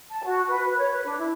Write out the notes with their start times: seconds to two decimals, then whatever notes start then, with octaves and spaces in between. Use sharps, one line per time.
0.10 A5
0.24 F#4
0.48 B4
0.66 B4
0.79 C#5
0.92 B4
1.05 D4
1.19 E4